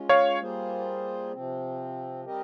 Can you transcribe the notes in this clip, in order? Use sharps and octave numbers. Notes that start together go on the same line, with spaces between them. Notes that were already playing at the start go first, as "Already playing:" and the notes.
Already playing: G#3 C#4 F4
C#5 F5
G3 A#3 F4 G#4 C5
C3 F3 C4
G3 C4 G4 A#4 D#5